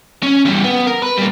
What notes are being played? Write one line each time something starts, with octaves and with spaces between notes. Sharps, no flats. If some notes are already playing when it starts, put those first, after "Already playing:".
C#4
E2 G3
B3
A#4
B4
G3 A#3